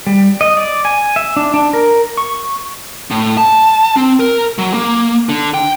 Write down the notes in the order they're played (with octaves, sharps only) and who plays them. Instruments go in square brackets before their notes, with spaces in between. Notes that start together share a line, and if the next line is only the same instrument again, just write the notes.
[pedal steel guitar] G3
D#5
D5
G#5
E5
D4
D4
A#4
C#6
[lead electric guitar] A2
A5
C4
A#4
F#3
A#3
D3
G5